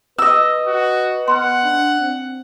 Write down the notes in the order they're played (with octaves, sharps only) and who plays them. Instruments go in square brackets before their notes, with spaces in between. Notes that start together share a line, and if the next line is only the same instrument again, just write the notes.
[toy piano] F4 [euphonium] B4 [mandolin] D#5 E6
[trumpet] F#4
[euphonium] B3 [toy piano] B4 B5 C6 [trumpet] F#5
[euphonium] D4
C4